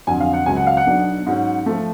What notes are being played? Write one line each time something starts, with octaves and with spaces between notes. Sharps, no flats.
F2 D3 F#3 G#5
F5
F#5
C#2 C#3 F#3 G#5
F#5
F5
F#5
B1 B2 F#3 B3 D4
G#2 F#3 C#4
F3 A3